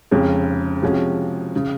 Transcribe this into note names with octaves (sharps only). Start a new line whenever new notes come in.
F1 F2 C#3 G#3 C#4
C3 F3 G#3 C#4 F#4
C#3